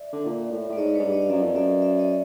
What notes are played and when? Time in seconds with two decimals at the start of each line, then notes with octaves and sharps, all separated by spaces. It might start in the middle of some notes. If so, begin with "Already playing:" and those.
Already playing: D5 E5
0.12 D3
0.26 A#2
0.51 A2
0.69 A2
0.73 D5
0.77 G#2 C#5 D#5
0.94 G#2 B4 C#5
1.04 G2
1.12 C#5 D#5
1.22 F5
1.29 F#2 D5 E5
1.42 F2
1.55 F#2 D5 E5
1.82 D5 E5
1.99 C#5 D#5